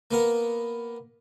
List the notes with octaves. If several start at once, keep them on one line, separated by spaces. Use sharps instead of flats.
A#3 B3 A#4